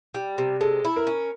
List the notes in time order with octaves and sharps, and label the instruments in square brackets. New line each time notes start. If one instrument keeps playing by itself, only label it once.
[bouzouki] G3
C3
[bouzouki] G#3 [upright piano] A4
[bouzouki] E4
[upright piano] A#4
[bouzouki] C#4